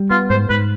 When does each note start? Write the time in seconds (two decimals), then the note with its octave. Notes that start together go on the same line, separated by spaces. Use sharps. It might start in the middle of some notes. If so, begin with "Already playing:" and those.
Already playing: G3
0.10 B3 F4
0.30 G#2 C5
0.50 G#2 B4